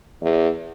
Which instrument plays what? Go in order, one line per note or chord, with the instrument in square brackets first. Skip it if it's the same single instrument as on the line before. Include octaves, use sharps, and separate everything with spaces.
[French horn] E2